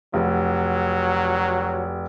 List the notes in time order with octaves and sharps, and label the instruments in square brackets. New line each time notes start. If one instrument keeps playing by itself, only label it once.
[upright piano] F1 [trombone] F#3